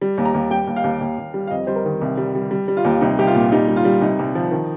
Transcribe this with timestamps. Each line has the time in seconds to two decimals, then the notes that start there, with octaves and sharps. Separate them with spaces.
0.01 G3
0.18 D#2
0.25 A#5
0.34 D#2
0.51 G3 G5
0.67 D#2
0.76 F5
0.84 D#2
1.01 D#2
1.18 D#2
1.34 G3
1.47 F5
1.51 F2 D#5
1.67 G3 C5
1.76 A#4
1.85 D#3
2.01 C2
2.17 G3
2.35 G3
2.51 G3
2.68 G3
2.77 F4
2.85 D#2
3.01 C2 D#4
3.18 C2 G4
3.27 F4
3.35 A#2
3.52 G3 D#4
3.68 G3
3.76 F4
3.85 G3
4.01 C2 D#4
4.19 C2
4.35 F3
4.51 D#3